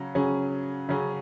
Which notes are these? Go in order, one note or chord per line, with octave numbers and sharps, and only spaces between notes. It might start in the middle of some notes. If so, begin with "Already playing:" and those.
Already playing: C#3 F#3 C#4
C#3 F#3 C#4 G#4
C#3 F#3 C#4 G#4